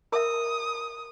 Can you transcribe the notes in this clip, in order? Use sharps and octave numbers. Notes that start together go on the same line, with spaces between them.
A#4 E5 D#6